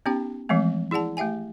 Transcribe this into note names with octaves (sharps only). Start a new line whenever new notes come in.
B3 C#4 D#4 G4 G5
E3 F3 G#3 A3 C4
E4 G#4 D5 F#5 A5
A3 G4 E5 G5 G#5